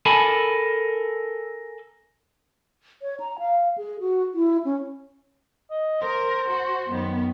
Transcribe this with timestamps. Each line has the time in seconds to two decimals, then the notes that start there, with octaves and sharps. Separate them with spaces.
0.06 A4 A#4 G#5 A5 B5
3.02 C#5
3.20 A#5
3.39 F5
3.78 G#4
4.00 F#4
4.34 E4
4.65 C#4
5.70 D#5
6.02 A#4 C5
6.49 F#4
6.89 F#2 D#3 B3